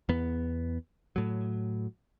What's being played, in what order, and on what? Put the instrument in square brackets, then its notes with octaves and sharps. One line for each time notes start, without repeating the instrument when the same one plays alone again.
[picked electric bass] E2 B3
A2 F#3